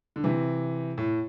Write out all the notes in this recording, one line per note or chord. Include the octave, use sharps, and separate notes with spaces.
D3
C3 E3
A2